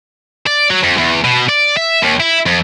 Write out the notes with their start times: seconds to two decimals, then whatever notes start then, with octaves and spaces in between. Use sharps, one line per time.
0.47 D5
0.70 F#3
0.83 F2
0.97 E2
1.24 B2
1.49 D5
1.77 E5
2.03 D#2
2.20 E4
2.46 F2